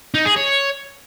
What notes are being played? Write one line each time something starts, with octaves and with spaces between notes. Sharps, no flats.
D#4
G#4
C#5